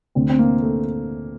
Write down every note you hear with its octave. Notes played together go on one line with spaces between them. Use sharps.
D2 D3 C4
C4
A#3
A3